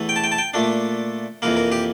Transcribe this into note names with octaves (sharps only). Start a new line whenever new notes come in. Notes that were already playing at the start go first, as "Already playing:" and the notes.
Already playing: E2 E3 A3
G5
A5
G5
A5
G5
A#2 A3 D4
F2 E3 A#3 A#4
A#4
G4